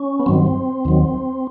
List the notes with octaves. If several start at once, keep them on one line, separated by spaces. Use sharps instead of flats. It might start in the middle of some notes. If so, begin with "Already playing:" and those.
Already playing: C#4
B3
G2 D#3 F#3 C4
D#2 D#3 F#3